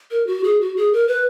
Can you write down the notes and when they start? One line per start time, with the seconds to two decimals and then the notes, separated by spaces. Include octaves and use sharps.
0.11 A#4
0.27 F#4
0.44 G#4
0.61 F#4
0.77 G#4
0.93 A#4
1.07 B4